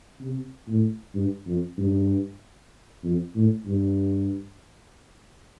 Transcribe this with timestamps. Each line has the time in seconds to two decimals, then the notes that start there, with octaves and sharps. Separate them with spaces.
0.21 C3
0.68 A2
1.15 G2
1.47 F2
1.78 G2
3.04 F2
3.36 A2
3.67 G2